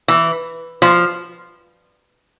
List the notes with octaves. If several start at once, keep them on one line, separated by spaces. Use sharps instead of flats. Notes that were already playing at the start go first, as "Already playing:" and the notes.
E3
F3